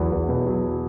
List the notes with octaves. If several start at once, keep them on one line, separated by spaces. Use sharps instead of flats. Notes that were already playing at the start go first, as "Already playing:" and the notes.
Already playing: E2 F#3
E2
B2
F#3